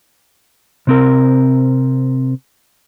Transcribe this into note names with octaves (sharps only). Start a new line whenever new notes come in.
C3 C4 A#4